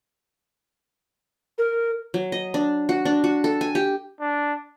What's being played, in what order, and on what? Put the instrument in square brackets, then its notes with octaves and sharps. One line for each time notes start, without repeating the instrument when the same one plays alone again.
[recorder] A#4
[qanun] F#3
D#5
D4
F#4
D4
F#4
A4
G#5
G4
[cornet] D4